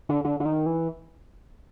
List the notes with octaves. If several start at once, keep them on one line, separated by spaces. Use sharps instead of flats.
D3
D3
D3
D#3
E3